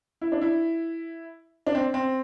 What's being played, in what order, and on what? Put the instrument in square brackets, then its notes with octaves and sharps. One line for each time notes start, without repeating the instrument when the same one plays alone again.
[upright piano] E4
D4
E4
D4
C4
C4